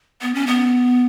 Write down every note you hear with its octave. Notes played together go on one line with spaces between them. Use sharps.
B3
C#4
B3